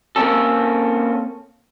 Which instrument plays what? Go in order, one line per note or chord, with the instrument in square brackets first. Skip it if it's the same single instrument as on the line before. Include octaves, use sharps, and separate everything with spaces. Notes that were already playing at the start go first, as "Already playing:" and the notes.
[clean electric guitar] A#3 C4 C#4 A4